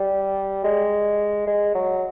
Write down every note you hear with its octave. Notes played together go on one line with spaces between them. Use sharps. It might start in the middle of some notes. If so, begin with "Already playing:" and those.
Already playing: G3
G#3
G#3
F#3